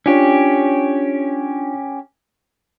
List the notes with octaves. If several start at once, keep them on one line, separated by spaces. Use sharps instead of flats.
C#4 D4 F4 G4 C#5